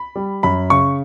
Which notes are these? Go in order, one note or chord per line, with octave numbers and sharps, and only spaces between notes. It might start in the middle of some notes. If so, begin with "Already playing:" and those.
Already playing: B5
G3
F#2 B5
C#3 C#6